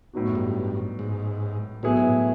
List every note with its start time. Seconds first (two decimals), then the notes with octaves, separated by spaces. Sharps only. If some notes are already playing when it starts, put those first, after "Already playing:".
0.13 A2 F#3 B3 D#4 F#4
0.28 F#2
0.35 G2
0.99 G#2
1.83 A2 F#3 B3 E4 G#4
1.97 G#2
2.09 A2